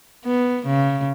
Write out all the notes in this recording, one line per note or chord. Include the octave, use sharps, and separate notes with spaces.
B3
C#3